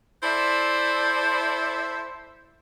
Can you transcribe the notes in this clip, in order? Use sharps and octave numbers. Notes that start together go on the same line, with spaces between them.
E4 A4 C5 D5 E5